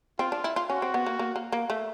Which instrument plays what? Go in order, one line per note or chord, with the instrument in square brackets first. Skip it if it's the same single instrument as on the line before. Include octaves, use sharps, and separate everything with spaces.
[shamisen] C4 [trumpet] F4
[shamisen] D4
E4
F4
[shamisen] C#4 [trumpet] F#4
[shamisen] C4
B3
A#3
A#3
A#3
A#3
A3